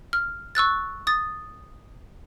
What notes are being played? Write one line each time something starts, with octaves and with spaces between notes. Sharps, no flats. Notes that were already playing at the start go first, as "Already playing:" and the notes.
F6
C#6 E6 F#6 A6
D#6 A6